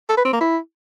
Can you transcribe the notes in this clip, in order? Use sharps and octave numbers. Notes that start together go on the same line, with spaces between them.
A4
B4
C4
A#3
E4